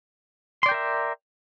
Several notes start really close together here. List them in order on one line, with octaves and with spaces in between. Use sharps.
C6 D5 G5 A#4 E5